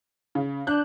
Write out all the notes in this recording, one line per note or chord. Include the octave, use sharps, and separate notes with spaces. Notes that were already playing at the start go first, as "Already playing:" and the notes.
C#3
D4 F#6 G6